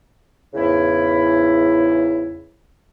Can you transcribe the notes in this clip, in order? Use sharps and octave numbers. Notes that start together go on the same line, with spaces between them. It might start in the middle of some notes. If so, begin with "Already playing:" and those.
E2 G#2 C#3 E4